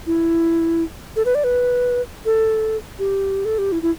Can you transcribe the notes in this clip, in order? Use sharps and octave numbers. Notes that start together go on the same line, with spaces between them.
E4
A4
B4
D5
B4
A4
G4
A4
G4
E4
E4